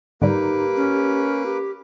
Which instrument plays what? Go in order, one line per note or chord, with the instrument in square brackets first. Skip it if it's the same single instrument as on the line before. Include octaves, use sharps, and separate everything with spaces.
[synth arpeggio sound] G#2 D3 G3 [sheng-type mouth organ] A#3 B4 D6 [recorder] D#4 [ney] G4
[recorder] C#4
G4